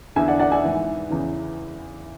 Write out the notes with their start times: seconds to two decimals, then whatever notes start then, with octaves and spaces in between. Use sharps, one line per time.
0.16 E2 D3 E5 G#5
0.28 D5 F#5
0.39 D5 F#5
0.51 E5 G#5
0.64 G#2 E3
1.10 E2 C#3 E3